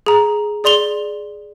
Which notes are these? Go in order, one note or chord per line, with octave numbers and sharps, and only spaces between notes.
G#4 A#5
G#4 D5 C6 F7 G7